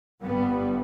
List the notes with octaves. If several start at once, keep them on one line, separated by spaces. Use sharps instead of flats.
G1 G2 G3 B3